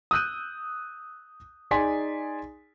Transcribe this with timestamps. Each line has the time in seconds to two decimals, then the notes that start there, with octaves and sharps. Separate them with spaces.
0.11 D#6 E6 F#6 G6 D#7
1.71 D#4 G#4 D5 G#5 C6 B6